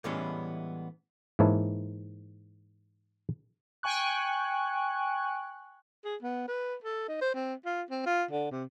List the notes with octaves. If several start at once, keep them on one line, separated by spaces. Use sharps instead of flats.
A2 E3 G3 G#3 B3 C#4
G#2 E3 A#3 E4 C#5 A5
G5 G#5 C#6 F#6
G#4
B3
B4
A4
D#4
C5
C4
F4
C4
F4
D3
C3